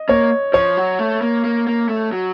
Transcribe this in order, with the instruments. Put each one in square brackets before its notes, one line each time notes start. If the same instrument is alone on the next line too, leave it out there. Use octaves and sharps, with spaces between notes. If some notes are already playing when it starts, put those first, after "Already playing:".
Already playing: [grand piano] D#5
[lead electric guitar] A#3 [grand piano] C#5
[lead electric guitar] F3 [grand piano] C#5
[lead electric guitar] F#3
A3
A#3
A#3
A#3
A3
F#3